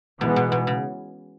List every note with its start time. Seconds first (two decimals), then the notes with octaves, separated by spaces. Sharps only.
0.21 B2 E3 G#3 B3
0.36 B2
0.52 B2
0.67 C#3